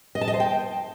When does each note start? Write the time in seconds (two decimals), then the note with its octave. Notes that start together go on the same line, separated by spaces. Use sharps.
0.15 D#5
0.21 A5
0.28 D#5
0.34 C5
0.40 G5